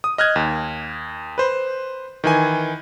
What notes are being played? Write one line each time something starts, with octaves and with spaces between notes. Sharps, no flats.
D#6
D#5 F6 F#6 G#6
D#2
B4 C5
D#3 E3 G#5